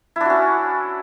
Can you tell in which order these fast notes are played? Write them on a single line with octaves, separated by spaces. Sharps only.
E4 D4 F#4 C#4